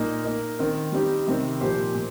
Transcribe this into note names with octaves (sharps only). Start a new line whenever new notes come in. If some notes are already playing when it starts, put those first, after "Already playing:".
Already playing: A#2 A#3 D#4
A#3 D#4 A#4
D#3 C4 D#4 A#4
G3 C4 D#4 G4
C3 D#3 G3 C4 G4
A#2 F3 D#4 G4 C5
A#2